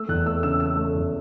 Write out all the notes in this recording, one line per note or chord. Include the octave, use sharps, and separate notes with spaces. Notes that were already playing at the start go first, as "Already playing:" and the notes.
Already playing: A3 E6
E2 F#6
A3 E6
C#3 E6
A3 E6
A3
E2